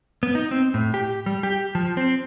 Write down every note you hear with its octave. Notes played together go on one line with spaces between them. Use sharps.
B3
D#4
C4
A2
G4
G3
G4
F3
C4